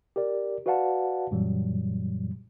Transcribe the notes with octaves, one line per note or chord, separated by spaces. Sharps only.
G4 A#4 D5
F#4 B4 D5 F5 F#5 A5
F#2 A#2 E3 F#3 G3